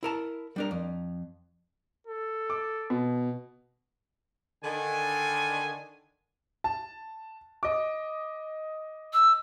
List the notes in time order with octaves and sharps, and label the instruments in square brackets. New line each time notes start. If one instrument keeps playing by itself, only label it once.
[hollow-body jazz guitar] E4 A#4 A5
G3 D4 A#4
F2
[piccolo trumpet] A4
[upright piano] D6
B2
[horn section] D3 D#3 G#5
[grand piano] A5
D#5 D6
[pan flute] E6